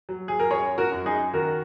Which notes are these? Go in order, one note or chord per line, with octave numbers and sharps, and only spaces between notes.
F#3
G#4
A#4
F#2 G#4 C#5
F#4 A#4
F#2
D#4 G#4
D#3 F#4 A#4